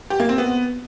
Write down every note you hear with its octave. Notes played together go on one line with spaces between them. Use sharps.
G4
A#3
C4
B3